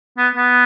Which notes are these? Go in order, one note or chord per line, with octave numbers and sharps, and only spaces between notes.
B3
B3